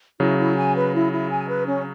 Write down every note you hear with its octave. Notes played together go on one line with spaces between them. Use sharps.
C#3 F#3 E4
E4
G#5
B4
E4
E4
G#5
B4
C#4